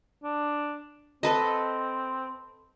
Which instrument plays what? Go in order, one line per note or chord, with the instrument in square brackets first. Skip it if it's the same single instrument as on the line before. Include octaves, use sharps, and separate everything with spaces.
[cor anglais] D4
[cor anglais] C4 [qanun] A4 B4 D#5